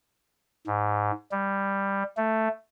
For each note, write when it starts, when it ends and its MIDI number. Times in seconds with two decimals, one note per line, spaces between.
0.67 1.11 44
1.32 2.03 55
2.17 2.48 57